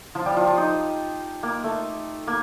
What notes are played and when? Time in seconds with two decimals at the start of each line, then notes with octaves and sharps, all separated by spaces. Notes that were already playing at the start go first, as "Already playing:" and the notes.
0.15 F3 F4
0.26 G3 G4
0.37 F3 F4
0.47 F3 F4
0.58 D#4
1.43 A#3
1.64 A3
2.27 A#3